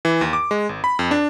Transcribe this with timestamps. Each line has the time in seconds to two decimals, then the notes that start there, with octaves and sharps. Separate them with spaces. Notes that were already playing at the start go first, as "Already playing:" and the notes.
0.05 E3
0.21 D#2
0.33 D6
0.51 G#3
0.69 G#1
0.84 B5
0.99 F2
1.11 D4